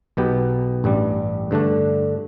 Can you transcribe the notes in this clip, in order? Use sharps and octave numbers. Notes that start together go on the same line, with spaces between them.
B1 B2 B3 G4
A1 G2 G3
G2 D3 A3 D4